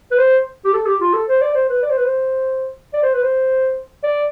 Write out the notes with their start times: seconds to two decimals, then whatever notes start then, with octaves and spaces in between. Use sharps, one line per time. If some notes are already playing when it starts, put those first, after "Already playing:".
0.11 B4
0.18 C5
0.65 G4
0.73 A4
0.86 G4
1.00 F4
1.14 A4
1.28 C5
1.41 D5
1.55 C5
1.69 B4
1.82 D5
1.90 C5
1.97 B4
2.05 C5
2.93 D5
3.03 C5
3.14 B4
3.23 C5
4.03 D5